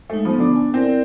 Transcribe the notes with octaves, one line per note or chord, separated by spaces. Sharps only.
G#3 A3 D#4
F3 B3
D3 D4
G#5
C4 E4 A#4 D5